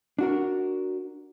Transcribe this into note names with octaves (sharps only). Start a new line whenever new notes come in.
D4 F#4 A#4